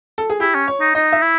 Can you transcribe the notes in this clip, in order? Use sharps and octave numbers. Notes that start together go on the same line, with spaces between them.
A4
G#4
E4 G4
C#4
C#5
D#4
D#4 D#5
E5
E4